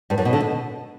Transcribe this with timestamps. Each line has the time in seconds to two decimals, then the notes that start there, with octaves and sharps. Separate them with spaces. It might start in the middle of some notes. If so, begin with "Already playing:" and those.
0.10 G2
0.18 F#2
0.25 B2
0.33 D3
0.41 B2